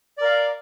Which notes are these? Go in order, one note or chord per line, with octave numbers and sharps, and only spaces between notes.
A#4 D5 F5